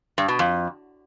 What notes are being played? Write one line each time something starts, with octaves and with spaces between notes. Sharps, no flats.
G2
B2
F2